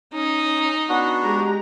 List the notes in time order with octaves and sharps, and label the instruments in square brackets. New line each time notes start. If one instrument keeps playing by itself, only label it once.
[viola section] C#4 [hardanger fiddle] D#4
[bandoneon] B3 D4 F#4
[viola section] G#3 G4 A#5